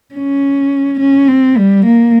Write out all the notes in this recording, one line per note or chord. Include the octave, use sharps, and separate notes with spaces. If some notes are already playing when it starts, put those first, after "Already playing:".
C#4
C#4
C4
G3
A#3